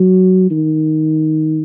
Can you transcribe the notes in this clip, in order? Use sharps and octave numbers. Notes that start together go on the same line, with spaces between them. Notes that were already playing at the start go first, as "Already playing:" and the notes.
Already playing: F#3
D#3